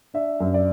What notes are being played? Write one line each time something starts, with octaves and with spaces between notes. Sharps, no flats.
D4 E5
F#2
D5